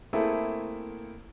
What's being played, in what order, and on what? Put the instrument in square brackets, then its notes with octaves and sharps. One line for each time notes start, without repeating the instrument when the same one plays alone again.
[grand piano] A3 A#3 C4 E4 G#4 A4